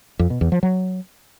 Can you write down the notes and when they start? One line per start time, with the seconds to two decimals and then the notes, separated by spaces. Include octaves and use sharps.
0.19 F2
0.30 B2
0.41 E2
0.52 F3
0.63 F#3